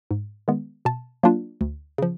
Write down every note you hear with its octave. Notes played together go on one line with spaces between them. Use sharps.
G#2
D#3 G#3 B3
B2 A5
F#3 A#3 D4 F4
D2
C#3 F3